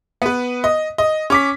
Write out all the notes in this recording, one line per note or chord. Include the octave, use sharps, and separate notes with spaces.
B3 B4
D#5
D#5
C#4 D6 B6